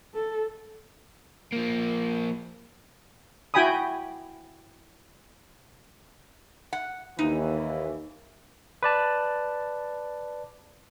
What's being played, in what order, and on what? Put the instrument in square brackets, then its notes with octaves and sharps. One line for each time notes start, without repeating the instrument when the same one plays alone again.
[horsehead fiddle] A4
[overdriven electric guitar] F3 A#3
[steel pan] E4 F#4 G5 G#5 B5 D#6
[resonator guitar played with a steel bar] F#5
[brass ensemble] D#2 E3 [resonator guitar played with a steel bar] D#4
[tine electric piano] B4 D5 A5